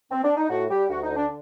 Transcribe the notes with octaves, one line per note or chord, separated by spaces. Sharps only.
C4
D4
D#4
A2 F#4
G3 G4
D2 F#4
D#4
D3
D4